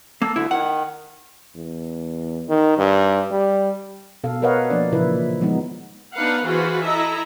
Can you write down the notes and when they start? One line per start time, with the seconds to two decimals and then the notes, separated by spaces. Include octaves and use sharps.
0.22 A#3 A4
0.36 D2 D3 E4
0.51 D#3 F#5
1.56 E2
2.49 D#3
2.78 G2
3.31 G3
4.24 B2 A4 F5
4.42 A#4 B4 C#5 D#5 F5 F#5
4.70 F3 A#3 D4 D5
4.92 A#2 C#3 E3 F3 E4 B4
5.40 D#3 F3 G#3 B3 D#4
6.15 B3 D4 D#4 B4 F5 F#5
6.46 E3 F4 F#4 G#4 B4 C5
6.83 E4 A4 D#5 E5 A#5